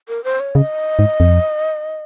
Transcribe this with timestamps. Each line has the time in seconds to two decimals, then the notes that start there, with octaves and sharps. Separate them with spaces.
0.08 A#4
0.24 C5
0.40 C#5
0.55 C#3 D#5
0.99 G#2
1.20 F2